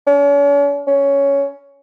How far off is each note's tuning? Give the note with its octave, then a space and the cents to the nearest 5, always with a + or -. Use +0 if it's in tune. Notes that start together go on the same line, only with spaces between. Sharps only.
C#4 +45
C#4 +10